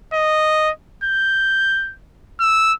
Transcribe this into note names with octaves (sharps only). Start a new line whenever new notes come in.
D#5
G6
E6